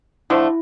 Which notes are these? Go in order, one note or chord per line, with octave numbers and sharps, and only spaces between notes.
D3 F3 A3 E4